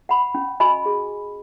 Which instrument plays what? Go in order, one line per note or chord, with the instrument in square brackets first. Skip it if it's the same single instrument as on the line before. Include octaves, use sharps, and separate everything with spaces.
[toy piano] F#5 B5
C#4
F#4 D#5 G#5 B5
G#4